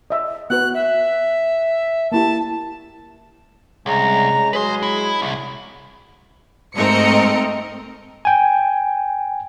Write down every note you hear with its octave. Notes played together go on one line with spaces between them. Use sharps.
D#5 E5
B3 F#4 B4 F#6
E5
A#3 E4 G4 A5
C2 C#3 G#3 A#5
F#3 G#3 G#4 B4 C6
E4
C2
G#2 A3 C4 A#4 D#5 C#7
G5 G#5